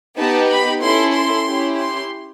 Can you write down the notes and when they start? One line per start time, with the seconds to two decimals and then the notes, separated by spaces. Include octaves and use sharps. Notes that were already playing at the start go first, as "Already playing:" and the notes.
0.17 B3 D#4 G4 A5
0.49 B5
0.81 C#4 E4 A4 C6
1.14 C6
1.46 C#4 E4 G4
1.78 C6